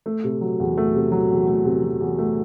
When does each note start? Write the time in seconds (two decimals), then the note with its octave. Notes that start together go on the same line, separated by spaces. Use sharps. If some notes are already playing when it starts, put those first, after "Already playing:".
0.06 A3
0.24 C3
0.41 F#3
0.60 E2
0.77 A3
0.95 C3
1.12 F#3
1.31 E2
1.48 A3
1.65 C3
1.83 F#3
2.01 E2
2.18 A3